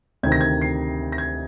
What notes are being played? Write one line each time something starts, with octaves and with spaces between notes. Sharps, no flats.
D2 C3 D#3 G#6
A#6
G#6
C7
A#6
G#6